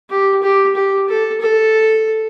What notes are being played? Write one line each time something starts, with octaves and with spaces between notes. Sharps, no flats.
G4
G4
G4
A4
A4